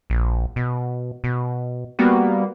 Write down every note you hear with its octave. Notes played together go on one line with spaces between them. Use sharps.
A#1
B2
B2
G3 A#3 B3 F#4